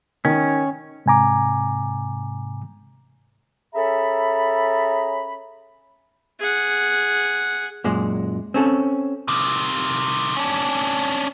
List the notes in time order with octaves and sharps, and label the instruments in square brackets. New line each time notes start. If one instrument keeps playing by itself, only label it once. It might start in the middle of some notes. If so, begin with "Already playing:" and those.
[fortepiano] D#3 [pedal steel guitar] C#4
[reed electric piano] G#2 C3 G#5 A#5 D6
[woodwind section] C#4 G#4 A4 E5 A#5 B5
[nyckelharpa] G#4 F#5
[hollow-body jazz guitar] F#2 A#2 G#3
C4 C#4 A4
[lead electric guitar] C3 D#3
C#4 D4